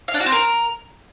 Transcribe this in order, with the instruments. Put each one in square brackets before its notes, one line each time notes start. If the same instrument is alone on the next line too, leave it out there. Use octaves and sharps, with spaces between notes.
[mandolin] F5
D4
F#4
C4
A#4